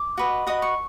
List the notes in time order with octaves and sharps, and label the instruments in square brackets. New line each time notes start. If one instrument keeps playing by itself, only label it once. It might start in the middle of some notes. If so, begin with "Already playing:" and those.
Already playing: [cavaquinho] D6
F#4 B4 D#5
F#4 B4 D#5 D#6
C#6